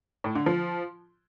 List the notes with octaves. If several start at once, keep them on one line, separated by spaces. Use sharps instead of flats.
A2
D3
F3